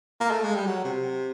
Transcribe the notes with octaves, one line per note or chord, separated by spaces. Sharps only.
A#3
A3
G#3
G3
F#3
C3